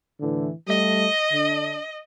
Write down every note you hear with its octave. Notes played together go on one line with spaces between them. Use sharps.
A2 D3 E3
G3 A3 D#5
D3 D4